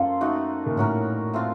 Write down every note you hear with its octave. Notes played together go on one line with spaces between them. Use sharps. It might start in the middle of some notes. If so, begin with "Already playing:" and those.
Already playing: F#2 A#3 F4 A4 C5
A3 D#4 F#4
A#2
A2 C#4 F#4 A#4
A3 C4 F4